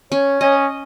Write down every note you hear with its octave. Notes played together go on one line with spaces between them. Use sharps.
C#4 C#5
C#4 D#5